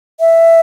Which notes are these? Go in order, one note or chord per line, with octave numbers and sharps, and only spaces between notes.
E5